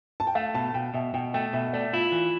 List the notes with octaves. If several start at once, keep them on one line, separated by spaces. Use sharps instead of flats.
A5
G5
A3 F5
B2 A5
B2 G5
B2 E5
B2 G5
A3 G5
B2 E5
E5
A3 D5
E4 F4
E3